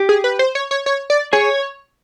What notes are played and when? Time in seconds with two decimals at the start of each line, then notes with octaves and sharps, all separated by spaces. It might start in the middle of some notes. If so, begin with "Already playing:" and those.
Already playing: G4
0.09 G#4
0.24 B4
0.39 C5
0.55 C#5
0.71 C#5
0.86 C#5
1.10 D5
1.33 G#4 C#5